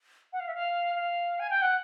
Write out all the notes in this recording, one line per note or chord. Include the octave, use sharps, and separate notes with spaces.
F#5
F5
E5
F5
F5
G#5
G5
F#5